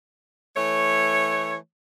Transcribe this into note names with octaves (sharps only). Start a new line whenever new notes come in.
E3 A3 C#5